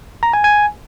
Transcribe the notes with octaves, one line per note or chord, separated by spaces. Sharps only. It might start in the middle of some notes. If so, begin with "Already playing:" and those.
A#5
G#5
G#5